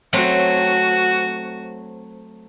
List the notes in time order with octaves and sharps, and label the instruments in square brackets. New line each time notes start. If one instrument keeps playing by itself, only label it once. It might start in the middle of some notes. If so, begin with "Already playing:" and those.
[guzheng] F#3 A3 C4 [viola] F#4